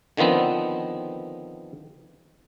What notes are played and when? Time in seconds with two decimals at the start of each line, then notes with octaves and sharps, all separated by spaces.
0.17 D3 D#3 F3 B3 C4